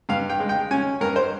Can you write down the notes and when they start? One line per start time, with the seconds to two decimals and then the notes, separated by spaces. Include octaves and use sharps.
0.09 G2 F5
0.30 G5
0.40 G#3
0.49 G5
0.71 C#4 G#5
1.01 G2 A#4
1.16 C5